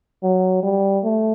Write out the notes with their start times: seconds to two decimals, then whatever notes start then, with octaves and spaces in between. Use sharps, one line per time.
0.23 F#3
0.63 G3
1.04 A3